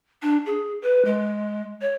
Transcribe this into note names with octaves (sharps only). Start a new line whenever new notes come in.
D4
G#4
B4
G#3
C#5